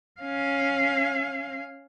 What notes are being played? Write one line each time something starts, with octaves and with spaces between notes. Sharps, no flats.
C#4 F5